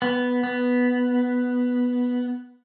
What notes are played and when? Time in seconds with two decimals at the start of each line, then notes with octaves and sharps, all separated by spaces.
0.02 B3
0.44 B3